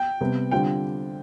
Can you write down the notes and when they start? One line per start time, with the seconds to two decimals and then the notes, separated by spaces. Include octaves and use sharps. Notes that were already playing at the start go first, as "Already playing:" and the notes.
Already playing: G5
0.21 C3 G3 B3
0.51 D3 G3 C4 F4 G5